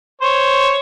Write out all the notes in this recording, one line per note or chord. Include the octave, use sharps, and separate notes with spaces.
C5 C#5